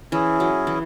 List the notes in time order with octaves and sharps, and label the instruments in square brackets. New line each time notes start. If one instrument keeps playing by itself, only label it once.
[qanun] E3 [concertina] C#4 E4 G#4
[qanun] F#3
E3